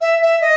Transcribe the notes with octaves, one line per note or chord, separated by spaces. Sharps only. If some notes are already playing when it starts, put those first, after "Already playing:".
E5
E5
D#5